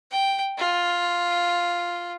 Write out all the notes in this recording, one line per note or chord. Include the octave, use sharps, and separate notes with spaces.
G5
F4